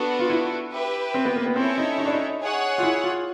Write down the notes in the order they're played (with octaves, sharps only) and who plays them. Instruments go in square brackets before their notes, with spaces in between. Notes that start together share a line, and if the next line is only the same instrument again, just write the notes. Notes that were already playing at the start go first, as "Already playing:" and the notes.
Already playing: [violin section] B3 D4 F#4 A4
[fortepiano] F4
E4
[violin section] G4 B4 E5
[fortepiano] C4
B3
A#3
B3
[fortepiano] C4 [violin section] C#4 E4 A4 C#5 E5
[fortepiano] D#4
D#4
D4
D#4
[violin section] G#4 C#5 F#5
[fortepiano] F4
E4
F4